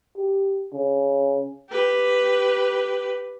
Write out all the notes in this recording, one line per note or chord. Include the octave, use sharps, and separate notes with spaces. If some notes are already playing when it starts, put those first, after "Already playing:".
G4
C#3
G4 B4